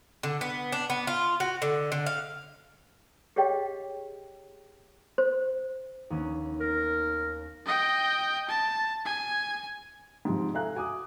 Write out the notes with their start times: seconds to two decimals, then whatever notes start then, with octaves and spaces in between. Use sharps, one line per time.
0.23 D3
0.41 B3
0.72 D4
0.90 B3
1.07 F4
1.40 F#4
1.62 D3
1.92 D3
2.06 F5
3.36 G4 G#4 C#5 D#5 F5 G5
5.18 C5
6.10 D#2 B3 C#4
6.60 A#4
7.66 D#5 G5
8.49 A5
9.05 G#5
10.25 G#2 C3 F3
10.54 A4 E5 F5 G#5 A#5 F#6
10.75 F#4 G#5 D6 D#6